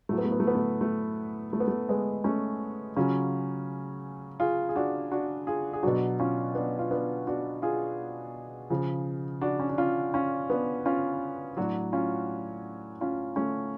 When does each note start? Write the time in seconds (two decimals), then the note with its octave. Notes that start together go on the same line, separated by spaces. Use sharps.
0.09 A2 F#3 A3
0.18 B3
0.25 A3
0.32 B3
0.40 A3
0.47 B3
0.55 A3
0.81 A3
1.53 A3
1.60 B3
1.68 A3
1.89 G#3 B3
2.24 A3 C#4
2.96 C#3 F#3 C#4 F4
4.40 F4 G#4
4.69 G#4
4.76 D4 F#4
5.11 D4 F#4
5.47 F4 G#4
5.73 G#4
5.83 B2 F#3 D4 F#4
6.19 C#4 F4
6.55 B3 D4
6.79 F4
6.91 B3 D4
7.27 D4 F#4
7.62 F4 G#4
8.70 C#3 F3
9.41 D4 F#4
9.60 C#4
9.69 D4
9.78 C#4 F4
10.14 C#4 F4
10.50 B3 D4
10.86 C#4 F4
11.57 A2 F#3 D4 F#4
11.93 C#4 F4
13.01 C#4 F4
13.36 A3 C#4